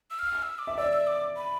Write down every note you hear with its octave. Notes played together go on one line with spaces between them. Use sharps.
E6
F6
F6
E6
D6
E5
D5 E6
E6
D6
B5